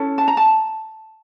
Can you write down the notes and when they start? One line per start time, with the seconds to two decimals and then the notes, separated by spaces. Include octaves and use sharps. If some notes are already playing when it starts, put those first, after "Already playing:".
Already playing: C#4 E4 A4
0.18 A5
0.28 A#5
0.37 A5